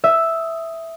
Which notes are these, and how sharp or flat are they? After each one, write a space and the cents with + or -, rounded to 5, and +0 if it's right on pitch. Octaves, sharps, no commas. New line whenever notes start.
E5 +0 D#6 +10